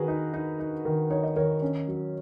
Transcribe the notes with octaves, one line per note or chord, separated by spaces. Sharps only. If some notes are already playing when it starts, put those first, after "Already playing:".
Already playing: D#3 F#4 G#4 A#4 B4
D#4
D#4
D#4
D#3
D#4 C#5
D#5
D#3 A#4 C#5
C#4
F#3